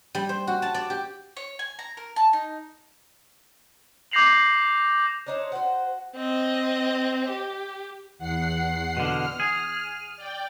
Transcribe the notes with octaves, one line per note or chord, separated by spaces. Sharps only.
G3
C5
F#4
A5
D5
G4
C#5
G#5
A#5
A#4
A5
D#4
D6 G6 A#6 C7 F7 F#7
D4 D#4 C5 C#5
F#4 C5 F#5
C4 D#5
G4
E2 F#5 C7
B2 D3 F6
G#4
D5 G5